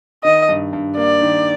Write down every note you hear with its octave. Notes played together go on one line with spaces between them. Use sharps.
D#3 D#5
G2
G2
A#3 D5
D#3